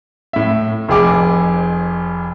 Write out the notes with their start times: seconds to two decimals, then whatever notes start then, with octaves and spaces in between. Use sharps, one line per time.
0.33 A2 E5
0.88 F1 F2 G#4 D6